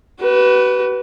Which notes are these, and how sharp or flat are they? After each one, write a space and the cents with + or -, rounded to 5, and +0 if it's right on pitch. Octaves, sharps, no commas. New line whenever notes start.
F#4 +40 B4 +0